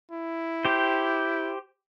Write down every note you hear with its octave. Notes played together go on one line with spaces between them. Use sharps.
E4
G4 C5